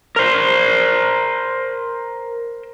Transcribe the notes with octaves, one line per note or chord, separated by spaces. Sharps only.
A#4 C5